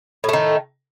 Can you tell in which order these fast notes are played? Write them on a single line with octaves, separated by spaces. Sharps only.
A2 A3 D#3